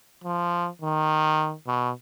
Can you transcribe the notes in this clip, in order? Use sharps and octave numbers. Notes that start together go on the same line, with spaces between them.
F3
D#3
B2